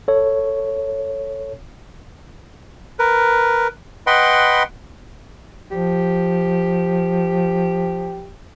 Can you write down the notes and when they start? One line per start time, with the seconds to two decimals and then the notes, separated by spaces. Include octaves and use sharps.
0.08 A4 C#5
2.99 A#4 B4
4.07 B4 D#5 F#5 G5 B5 C6
5.71 F3 G4